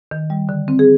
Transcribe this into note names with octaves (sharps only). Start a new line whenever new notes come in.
D#3
G3
D3
C4
G#4